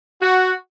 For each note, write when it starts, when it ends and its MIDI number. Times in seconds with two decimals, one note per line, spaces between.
0.21 0.52 66